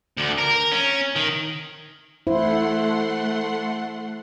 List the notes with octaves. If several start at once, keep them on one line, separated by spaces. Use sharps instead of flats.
D2
A#4
C#4
D#3
A3 E4 C5 F#5 C6